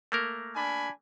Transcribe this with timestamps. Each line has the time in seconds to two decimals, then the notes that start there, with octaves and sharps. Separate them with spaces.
0.12 A3 A#3 A#4
0.56 D4 G#5 B5